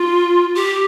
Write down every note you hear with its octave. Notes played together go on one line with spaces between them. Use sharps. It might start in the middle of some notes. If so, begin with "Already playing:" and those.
Already playing: F4
G4